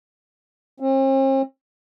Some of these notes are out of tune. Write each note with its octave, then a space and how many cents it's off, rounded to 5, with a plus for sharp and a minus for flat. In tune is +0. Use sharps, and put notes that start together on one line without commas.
C4 +45